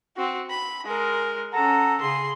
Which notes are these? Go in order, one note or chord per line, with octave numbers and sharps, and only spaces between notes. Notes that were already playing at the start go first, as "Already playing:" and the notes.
C4 F#4
B5
G#3 A#4
C#4 A4 F#5 A#5
C#3 G#4 C6